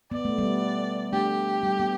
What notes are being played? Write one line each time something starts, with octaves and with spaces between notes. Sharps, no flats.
B3 D5
A3
G3 B3
A3 D4 G4
G3
B3